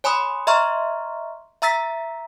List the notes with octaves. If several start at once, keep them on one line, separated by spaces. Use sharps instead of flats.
C#5 G#5 B5 C6 D#6
D#5 E5 A#5 C6 C#6 F6
E5 A#5 E6 A6 B6